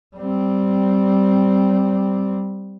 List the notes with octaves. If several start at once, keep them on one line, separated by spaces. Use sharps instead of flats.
G3 C4